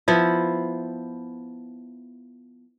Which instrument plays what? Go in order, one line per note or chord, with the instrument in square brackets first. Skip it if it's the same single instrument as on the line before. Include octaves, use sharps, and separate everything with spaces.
[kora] F3 B3 E4